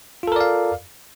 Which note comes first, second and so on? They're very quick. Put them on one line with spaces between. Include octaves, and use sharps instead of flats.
F4 A4 A#4 D5 F5